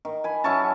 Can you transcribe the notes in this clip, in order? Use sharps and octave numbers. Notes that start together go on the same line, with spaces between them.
D#3
G#5 B5
F#3 C#4 E4 A5 C#6